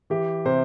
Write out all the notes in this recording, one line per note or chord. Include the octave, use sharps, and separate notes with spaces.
E3 G4
C3 C5